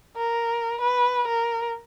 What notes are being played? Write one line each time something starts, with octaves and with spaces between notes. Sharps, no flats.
A#4
B4
A#4